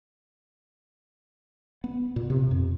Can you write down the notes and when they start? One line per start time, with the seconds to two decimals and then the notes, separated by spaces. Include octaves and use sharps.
1.84 B3
2.16 A#2
2.30 C3
2.51 F2